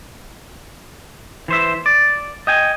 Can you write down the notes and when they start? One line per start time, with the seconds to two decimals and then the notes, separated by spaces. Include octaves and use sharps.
1.48 E3 C5 E5
1.86 D5
2.47 D#5 G5 G#5